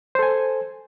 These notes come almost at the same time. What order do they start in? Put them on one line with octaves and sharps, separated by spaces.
C5 A4 G#5